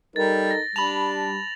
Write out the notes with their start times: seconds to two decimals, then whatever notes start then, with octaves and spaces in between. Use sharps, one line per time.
0.16 G3 D#4 A4 A#4 A6
0.47 A6 A#6
0.76 G3 D4 A5 B5 F7 F#7